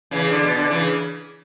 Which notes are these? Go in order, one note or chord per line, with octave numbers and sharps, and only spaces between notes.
C#3 E3
D3
B2
D3
C#3 E3